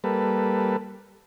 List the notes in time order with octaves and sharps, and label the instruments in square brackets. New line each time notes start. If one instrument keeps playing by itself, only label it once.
[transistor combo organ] G3 A#3 A4 B4